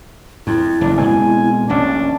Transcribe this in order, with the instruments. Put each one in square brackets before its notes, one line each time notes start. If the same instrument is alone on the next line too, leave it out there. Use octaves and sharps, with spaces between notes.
[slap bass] F2 [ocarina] E4
[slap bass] F#1 E2 [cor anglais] D4
[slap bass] B2 G#3 C4 [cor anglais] G#5
[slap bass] F1 A#1 C#4 [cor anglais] D4